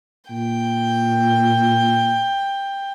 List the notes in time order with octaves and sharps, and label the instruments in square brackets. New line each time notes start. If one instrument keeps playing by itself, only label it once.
[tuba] A#2 [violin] G5